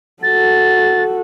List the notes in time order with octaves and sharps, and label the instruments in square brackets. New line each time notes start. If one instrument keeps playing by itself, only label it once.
[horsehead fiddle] F#4 A4 [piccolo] A6